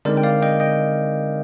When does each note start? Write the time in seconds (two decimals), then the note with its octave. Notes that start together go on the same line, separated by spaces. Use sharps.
0.05 D3 G#3 C4 D#4 A#4 D5
0.17 G5
0.23 D5 F5
0.42 D#5 G5
0.60 D#5 G5